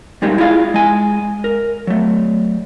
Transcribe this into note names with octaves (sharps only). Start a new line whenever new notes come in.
G3 G#3 A#3 D#4 G4
E4 F4 G#4 F5
G#3 G#5
A#4
F#3 A3